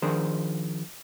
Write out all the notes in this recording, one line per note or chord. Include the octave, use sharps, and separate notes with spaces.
D#3 F3 D4 G#4 A#4 C5